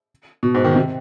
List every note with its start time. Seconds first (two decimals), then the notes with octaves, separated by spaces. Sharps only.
0.43 B2
0.54 G#2
0.64 D#3
0.76 C3